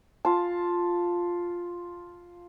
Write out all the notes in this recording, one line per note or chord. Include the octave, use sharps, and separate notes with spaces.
F4 A5